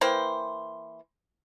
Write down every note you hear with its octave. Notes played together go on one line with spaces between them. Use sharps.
E3 A#3 C5 G5